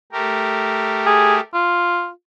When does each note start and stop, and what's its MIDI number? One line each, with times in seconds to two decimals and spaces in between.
0.12 1.40 57
0.12 1.40 67
0.12 1.40 70
1.06 1.36 68
1.54 2.09 65